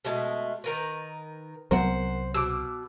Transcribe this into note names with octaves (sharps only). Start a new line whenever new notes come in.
B2 G#3 A3
D#3 A#4 B4
C2 F#3 B3 A#4 C5 F#5
B2 D6 E6